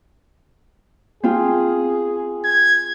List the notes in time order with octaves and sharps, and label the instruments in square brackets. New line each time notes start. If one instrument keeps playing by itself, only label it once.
[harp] C4 F4 [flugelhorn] G#4
[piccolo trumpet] G#6